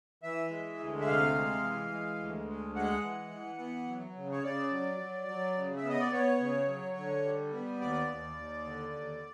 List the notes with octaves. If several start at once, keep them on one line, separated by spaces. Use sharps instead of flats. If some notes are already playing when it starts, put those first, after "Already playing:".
E3 E5
G#3
D2
E5
C3 F5
G#3
E3
G#3
D2
G#3
G#3 F#5
E3
E3
B3
F#3
C#3
C#5
C#3 D5
F#3
F#3
F#3
C#3
E5
B3
D#5
D5
B3 C#5
C#3
F#3
D3
G3
B3
D#2 D5
D#2
D#2
D3
D#2